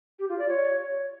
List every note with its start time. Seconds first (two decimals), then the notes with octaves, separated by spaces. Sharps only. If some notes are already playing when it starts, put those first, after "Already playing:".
0.19 G4
0.29 F4
0.39 D5
0.48 C#5